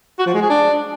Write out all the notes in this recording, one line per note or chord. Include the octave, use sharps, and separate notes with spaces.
F#4
F3
G#3
G#4
D4